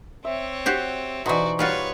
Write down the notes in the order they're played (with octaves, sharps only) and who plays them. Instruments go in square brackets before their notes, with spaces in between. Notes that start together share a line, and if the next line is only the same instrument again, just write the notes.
[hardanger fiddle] C4 C#5 [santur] E5
[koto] F#4 G4 C5
[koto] B2 E3 [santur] D#4 C5 C#6 [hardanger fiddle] F#4 D5
[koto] G3 F4 F#4 [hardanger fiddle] B4 C#5